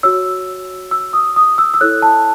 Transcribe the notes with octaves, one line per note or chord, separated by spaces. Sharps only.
F#4 C#5 E6
E6
D#6
D#6
E6
E6
E4 A4 C#5 F#6
A5